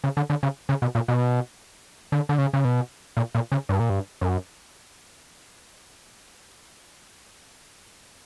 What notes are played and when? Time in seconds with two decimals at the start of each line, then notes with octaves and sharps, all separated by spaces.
0.04 C#3
0.17 D3
0.30 D3
0.43 C#3
0.69 C#3
0.82 B2
0.95 A#2
1.08 B2
2.12 D3
2.29 D3
2.38 C#3
2.53 C#3
2.65 B2
3.17 A#2
3.35 A#2
3.52 C#3
3.69 G2
3.80 A#2
3.90 G2
4.21 F#2